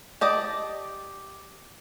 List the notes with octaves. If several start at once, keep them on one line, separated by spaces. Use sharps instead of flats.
G4 D5 D#5 A5